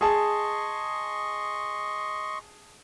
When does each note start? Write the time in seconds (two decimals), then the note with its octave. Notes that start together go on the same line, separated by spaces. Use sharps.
0.01 G#4 D#5 A5 C6 C#6